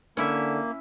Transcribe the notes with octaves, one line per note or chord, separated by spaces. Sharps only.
D3 A#3 C#4 E4 E5